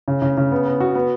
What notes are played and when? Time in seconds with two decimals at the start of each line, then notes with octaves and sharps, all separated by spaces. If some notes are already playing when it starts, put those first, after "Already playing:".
0.08 C#3
0.22 C#3
0.37 C#3
0.51 B3
0.66 B3
0.80 F#4
0.95 B3